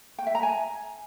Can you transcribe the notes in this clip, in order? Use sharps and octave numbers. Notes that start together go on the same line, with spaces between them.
G5
E5
A#5
G#5